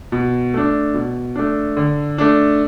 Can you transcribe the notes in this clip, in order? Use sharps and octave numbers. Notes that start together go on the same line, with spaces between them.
B2
A3 D4
B2
A3 D4
D3
A3 D4